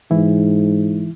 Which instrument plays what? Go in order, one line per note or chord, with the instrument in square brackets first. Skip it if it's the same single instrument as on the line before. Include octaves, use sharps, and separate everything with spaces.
[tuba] G#2 [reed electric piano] E3 E4